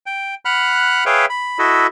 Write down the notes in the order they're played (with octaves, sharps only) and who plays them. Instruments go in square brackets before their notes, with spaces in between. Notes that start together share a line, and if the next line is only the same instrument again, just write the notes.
[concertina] G5
F#5 B5 F6 F#6
G#4 B4 C#5 E5 F5 G5
B5
E4 F#4 A4 D#5 E5